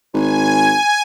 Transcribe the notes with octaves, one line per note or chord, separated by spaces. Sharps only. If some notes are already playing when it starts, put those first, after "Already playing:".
G#1 G#5